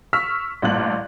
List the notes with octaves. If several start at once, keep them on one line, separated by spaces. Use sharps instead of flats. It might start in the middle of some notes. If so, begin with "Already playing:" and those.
C#6 E6 F6 B6
A1 G2 A#2 F#6 F#7